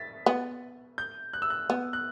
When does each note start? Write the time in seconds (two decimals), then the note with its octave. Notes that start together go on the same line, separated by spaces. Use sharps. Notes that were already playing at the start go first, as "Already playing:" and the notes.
Already playing: A6 B6
0.26 B3
0.98 G6
1.33 F#6
1.42 E6
1.50 F#6
1.70 B3
1.93 F#6